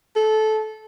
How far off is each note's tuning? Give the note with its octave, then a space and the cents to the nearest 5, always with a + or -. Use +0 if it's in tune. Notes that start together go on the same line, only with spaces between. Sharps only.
A4 -20